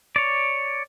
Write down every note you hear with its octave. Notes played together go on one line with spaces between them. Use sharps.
C#5 D5